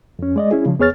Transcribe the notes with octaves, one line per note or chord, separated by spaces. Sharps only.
F2 C#4
G#3 D5 D#5
C#4 E4 G#4
C#3 F3
E2 B3 G#4 C#5 F6 A6